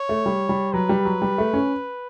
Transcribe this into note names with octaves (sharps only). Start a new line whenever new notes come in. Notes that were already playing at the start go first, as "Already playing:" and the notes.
Already playing: C#5
A3
G3
G3
F#3 B4
G3
F#3
G3
A3
C#4